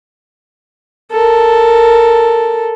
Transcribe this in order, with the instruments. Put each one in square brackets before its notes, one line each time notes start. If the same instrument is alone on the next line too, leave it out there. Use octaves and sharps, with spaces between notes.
[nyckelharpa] A4 A#4